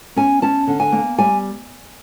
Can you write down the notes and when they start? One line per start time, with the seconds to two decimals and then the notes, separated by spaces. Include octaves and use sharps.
0.16 C#4 G#5
0.42 C#4 A5
0.67 D3
0.80 G#5
0.92 A#3
1.18 G3 G#5